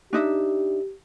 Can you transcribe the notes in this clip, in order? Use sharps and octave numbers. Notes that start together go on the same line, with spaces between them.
D4 D#4 G4 E5